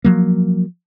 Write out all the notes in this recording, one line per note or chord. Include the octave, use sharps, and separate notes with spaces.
F3 F#3 A#3